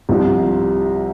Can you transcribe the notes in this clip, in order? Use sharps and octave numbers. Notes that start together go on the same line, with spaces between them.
C2 C3 F3